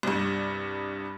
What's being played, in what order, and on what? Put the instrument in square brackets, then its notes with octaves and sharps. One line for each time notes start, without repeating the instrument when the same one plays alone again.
[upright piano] C2 G2